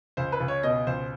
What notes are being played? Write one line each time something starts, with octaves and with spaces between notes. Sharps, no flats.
C#2 C5
B4
C#2
C#5
B2 D#5
C#2 C5